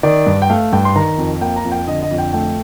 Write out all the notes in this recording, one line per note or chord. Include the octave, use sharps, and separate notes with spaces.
D#3 D5
G2
G5
A3 F5
G2 G5
C6
D#3 A#5
F2
A#3 G5
A#5
F2
G5
D3 D#5
D#5
F2
G5
A3 G5